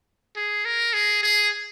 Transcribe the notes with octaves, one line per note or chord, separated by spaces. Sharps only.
G#4
A#4
G#4
G#4